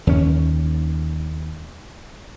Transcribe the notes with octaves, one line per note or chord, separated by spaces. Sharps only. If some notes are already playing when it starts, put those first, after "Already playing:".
D#2 C#4